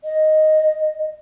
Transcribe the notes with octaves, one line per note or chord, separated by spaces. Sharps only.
D#5